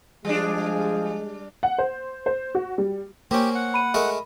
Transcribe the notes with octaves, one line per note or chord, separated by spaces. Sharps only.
F3 G3 G#3 D4 G#4
F#5
C5
C5
F#4
G3
A#3 C4 C#4 G4
F#5
B5 D#7
G#3 A3 A#4